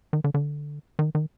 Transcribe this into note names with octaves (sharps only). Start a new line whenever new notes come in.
D#3
D3
D3
D#3
D#3